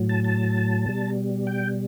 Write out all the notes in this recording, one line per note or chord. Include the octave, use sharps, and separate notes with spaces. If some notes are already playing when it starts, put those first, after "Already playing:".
Already playing: A2 F#3
A5
A5
B2 G3
G5